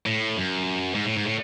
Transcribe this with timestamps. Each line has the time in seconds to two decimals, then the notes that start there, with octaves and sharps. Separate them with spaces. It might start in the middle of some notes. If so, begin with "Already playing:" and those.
0.06 A2
0.37 F#2
0.95 G#2
1.05 A2
1.16 G#2
1.25 A2